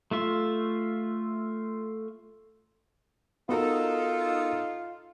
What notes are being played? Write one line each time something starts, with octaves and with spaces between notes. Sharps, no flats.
A3 F4 E5
B3 D#4 F4 F#4 A4 A#4